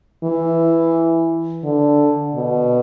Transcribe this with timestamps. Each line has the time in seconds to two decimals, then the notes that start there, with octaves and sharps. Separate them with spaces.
0.24 E3
1.64 D3
2.35 B2